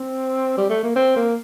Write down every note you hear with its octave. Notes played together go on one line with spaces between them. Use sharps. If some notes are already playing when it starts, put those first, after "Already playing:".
Already playing: C4
G3
A3
A#3
C4
A#3